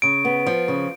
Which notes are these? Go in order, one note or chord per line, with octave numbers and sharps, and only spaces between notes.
C#3 D7
B3
F3
C#3